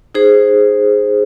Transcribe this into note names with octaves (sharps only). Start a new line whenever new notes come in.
D#4 G#4 C5